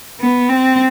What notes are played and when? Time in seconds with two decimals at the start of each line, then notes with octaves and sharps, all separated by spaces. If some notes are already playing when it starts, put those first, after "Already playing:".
0.21 B3
0.49 C4